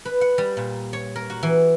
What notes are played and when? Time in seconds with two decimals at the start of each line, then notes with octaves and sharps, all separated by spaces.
0.05 B4
0.21 F#5
0.38 G3
0.57 A#2
0.93 C#5
1.16 A#4
1.30 F#4
1.43 E3